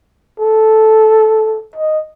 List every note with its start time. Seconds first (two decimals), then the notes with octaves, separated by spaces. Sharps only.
0.40 A4
1.76 D#5